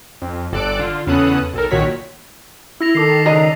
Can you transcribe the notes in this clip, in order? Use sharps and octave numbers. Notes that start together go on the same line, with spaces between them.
F2
G1 A4 D5 F#6 D7
D3 F4
E2 C#3 B3 A4 D#6 F#6
B1 A4 A#4
B1 A#2 D#3 F#4 C#5 B6
E4 E6 A#6 F7
D#3 A4 D6 C7
C#2 D4 D#5 A#5